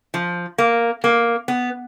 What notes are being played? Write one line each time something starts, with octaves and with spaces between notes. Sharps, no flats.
F3
A#3
A#3
B3